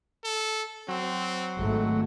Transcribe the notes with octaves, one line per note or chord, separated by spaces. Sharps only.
A4
F#3 C4
G#1 A3